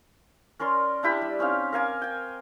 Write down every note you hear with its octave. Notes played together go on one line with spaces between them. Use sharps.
C#4 A#4 D5 C6
D4 E4 G4 B5
G3
C4 C#4 D#4 F5
A#4 F5 G#5 D6
G5 G#5